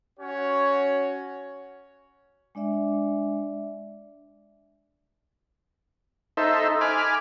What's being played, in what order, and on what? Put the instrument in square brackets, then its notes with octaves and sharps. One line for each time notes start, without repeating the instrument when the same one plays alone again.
[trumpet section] C#4 F#4 C#5
[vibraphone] G#3 D4 D5 E5
[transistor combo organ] D#4 A4 C5 E5
G#5 B5 D6 F6